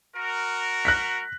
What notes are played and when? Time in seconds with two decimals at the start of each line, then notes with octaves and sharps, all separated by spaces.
0.16 F#4 A#4
0.85 F#6 A#6 B6